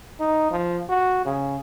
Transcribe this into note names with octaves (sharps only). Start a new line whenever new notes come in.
D#4
F3
F#4
C#3